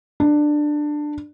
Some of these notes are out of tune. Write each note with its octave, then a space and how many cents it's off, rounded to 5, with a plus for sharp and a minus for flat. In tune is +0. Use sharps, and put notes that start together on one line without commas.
D4 +15